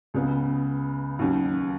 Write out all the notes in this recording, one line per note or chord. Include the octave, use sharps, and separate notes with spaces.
C#2 C#3 B3
D#2 D#3 F#3 C#4